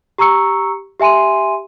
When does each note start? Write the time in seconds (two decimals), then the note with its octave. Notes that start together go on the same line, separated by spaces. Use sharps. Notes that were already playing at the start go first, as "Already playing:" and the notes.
0.18 G4 A#5 C#6 E6 C#7
1.00 G4 E5 G#5 C6 D#7